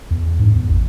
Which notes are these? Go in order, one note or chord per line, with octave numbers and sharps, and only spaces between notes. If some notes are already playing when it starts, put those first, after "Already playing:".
E2
G#2
E2
A1